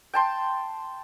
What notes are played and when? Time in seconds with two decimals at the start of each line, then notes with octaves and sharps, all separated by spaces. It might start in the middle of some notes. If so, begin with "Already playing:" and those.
0.13 G5 A5 C6